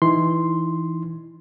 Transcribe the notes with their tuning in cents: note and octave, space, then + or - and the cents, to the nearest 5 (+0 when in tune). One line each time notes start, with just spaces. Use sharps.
E3 +0 D#4 +0 C6 +0